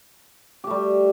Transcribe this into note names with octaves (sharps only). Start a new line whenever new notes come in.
G3 A3 G4